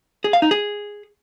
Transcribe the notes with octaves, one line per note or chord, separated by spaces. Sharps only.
G#4
F5
D#4
G#4